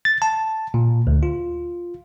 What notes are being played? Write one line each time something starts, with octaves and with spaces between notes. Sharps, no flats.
A6
A5
A#2
D2
F4